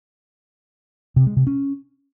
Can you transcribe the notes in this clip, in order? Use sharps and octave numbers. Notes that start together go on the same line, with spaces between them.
C3
G#3
C3
C#4